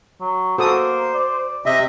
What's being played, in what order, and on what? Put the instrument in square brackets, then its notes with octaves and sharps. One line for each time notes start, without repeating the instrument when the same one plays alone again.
[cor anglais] F#3
[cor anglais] A#3 [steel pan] F#4 A4 D#6 [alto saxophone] C5
[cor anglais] D5
[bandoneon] C3 D#5 E5 [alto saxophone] G4